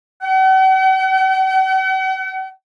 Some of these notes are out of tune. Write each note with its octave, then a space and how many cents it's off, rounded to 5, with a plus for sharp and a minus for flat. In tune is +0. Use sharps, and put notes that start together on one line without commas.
F#5 +45